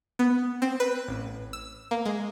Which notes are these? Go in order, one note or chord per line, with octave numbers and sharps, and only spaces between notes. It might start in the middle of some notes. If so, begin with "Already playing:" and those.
B3
C4
B4
A1
E6
A#3
G#3